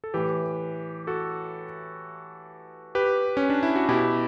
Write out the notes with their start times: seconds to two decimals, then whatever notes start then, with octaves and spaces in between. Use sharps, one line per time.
0.04 A4
0.14 A2 E3 G4 B4
1.07 F#4 A4
2.95 G4 B4
3.37 C#4
3.50 D4
3.63 E4
3.76 F#4
3.89 B2 E4 G4